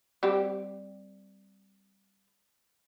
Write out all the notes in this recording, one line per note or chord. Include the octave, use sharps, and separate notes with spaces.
G3 C4 G4